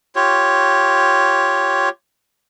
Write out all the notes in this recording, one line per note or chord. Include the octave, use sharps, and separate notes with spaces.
F4 G4 C#5